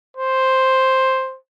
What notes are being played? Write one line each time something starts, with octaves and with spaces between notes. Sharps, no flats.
C5